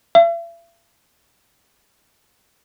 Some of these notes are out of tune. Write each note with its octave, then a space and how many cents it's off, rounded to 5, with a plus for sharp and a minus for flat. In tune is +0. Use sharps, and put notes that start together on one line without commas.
E5 +45